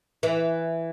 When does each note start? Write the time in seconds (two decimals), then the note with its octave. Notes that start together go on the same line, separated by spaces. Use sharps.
0.23 E3